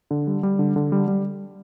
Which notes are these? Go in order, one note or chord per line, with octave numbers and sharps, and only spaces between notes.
D3
G3
G3
D3
D3
G3
G3